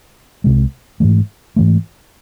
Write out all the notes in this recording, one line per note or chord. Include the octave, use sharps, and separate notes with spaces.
C2 C3 G#3
G#2 E3 A3
G#2 E3 A3